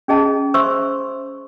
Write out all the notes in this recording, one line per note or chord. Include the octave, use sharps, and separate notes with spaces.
C#4 G#4 D#5 A5
C5 E5 C6 C#6 E6